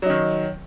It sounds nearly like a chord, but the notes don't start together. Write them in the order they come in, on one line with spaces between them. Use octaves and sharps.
F#3 D#4 D#3